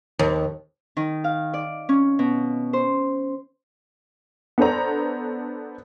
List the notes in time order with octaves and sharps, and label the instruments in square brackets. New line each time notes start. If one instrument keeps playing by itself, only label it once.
[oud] D#2
[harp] D#3
F5
D5
C#4
B2
C5
[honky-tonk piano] B3 D4 A4 C5 A#5